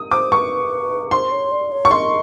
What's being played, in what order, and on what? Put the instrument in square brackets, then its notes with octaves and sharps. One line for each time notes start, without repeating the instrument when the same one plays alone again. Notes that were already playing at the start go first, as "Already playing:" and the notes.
Already playing: [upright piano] D#6
[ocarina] C5 [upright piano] D6
[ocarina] B4 [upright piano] C#6
[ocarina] C5 [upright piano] C6
[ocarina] C#5
D5
C#5
[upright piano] C#6
[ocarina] E5 [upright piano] C6
[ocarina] D#5